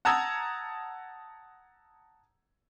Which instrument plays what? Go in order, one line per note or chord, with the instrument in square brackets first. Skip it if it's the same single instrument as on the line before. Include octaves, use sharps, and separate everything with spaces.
[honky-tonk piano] F#5 A5 A#5 D#6 E6 G#6